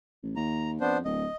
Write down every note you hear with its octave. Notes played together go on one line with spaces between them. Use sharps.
A1
D#2 A#5
F2 B3 D4 C5
D1 D#5